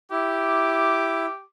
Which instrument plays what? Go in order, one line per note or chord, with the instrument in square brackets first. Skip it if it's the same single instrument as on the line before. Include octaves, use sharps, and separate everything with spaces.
[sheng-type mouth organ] E4 [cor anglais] G4 [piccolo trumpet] D6